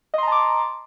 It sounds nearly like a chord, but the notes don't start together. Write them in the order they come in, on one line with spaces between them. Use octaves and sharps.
D#5 C6 A#5 A5 D6